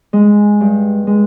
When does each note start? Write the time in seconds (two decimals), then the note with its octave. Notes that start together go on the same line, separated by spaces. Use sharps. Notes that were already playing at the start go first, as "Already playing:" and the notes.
0.13 G#3
0.61 G2
1.07 G#3